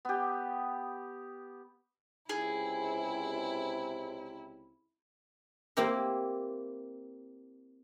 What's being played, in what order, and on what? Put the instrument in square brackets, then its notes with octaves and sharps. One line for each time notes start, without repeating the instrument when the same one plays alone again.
[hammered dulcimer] B3 G4
[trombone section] C#2 C3 [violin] E4 [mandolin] G#4
[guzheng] A#3 C4 E4 G4 A#4